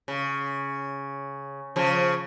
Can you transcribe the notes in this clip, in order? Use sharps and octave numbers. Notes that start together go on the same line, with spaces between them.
C#3
C#3 F3